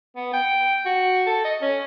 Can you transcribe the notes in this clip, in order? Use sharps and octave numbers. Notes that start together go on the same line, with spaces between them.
B3
G5
F#4
A4
D#5
C#4